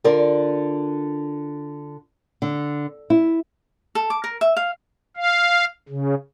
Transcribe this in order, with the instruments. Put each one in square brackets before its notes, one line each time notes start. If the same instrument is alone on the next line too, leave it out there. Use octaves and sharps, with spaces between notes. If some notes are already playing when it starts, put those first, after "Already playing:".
[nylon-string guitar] D3 F4 A#4 D5
D3
E4
[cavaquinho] A4
D6
A#4
E5
F5
[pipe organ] F5
C#3